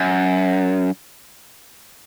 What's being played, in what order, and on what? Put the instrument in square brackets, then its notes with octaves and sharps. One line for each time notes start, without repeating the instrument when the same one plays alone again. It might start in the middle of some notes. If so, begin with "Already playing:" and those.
Already playing: [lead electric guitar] F#2